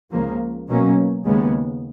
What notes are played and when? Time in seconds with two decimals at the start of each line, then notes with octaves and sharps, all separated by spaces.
0.11 C#2 C#3 F3 A#3
0.68 B2 F#3 A#3 C#4
1.25 D#2 C#3 G#3 B3